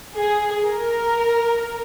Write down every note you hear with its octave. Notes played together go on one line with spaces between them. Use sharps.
G#4
A#4